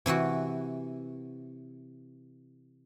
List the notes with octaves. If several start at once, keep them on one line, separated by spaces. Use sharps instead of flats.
C3 E3 E4 F#4